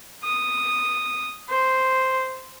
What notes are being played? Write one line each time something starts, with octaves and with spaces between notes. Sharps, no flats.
D#6
C5